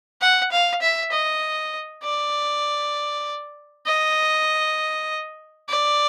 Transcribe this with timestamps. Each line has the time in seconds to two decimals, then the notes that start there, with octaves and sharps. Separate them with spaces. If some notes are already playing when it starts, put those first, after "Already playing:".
0.21 F#5
0.52 F5
0.82 E5
1.12 D#5
2.03 D5
3.86 D#5
5.69 D5